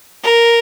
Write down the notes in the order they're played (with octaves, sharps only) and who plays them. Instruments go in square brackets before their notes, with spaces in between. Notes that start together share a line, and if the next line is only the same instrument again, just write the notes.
[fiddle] A#4